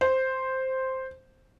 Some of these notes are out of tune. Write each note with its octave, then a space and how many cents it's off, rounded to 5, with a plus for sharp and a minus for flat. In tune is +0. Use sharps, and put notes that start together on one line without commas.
C5 +0